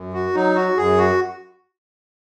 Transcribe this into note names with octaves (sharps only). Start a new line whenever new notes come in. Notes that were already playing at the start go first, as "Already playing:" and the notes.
Already playing: F#2
F#4
F#3 D#4
F#4
F#2 G#4
F#4